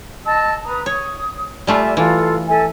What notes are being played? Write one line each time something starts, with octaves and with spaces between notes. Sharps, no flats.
D#5 A5 E6
B4 A#5 D#6
C#5 D#6
G3 A3 F4 D5 E5 G#5
E3 F4 A4 B4
A4 E5 G#5